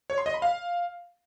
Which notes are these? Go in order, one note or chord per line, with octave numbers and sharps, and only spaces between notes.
C#5
C6
D#5
B5
F5